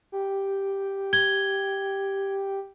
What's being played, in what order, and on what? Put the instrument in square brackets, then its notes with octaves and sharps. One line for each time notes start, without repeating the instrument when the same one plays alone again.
[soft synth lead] G4
[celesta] G#6 G7